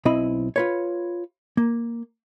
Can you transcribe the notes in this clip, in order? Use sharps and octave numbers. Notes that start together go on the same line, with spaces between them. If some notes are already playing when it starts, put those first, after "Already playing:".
B1 C4 E4 D#5 B5
F4 B4 C#5
A#3